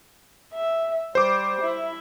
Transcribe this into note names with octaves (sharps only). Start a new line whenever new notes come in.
E5
G3 C5 D6
E4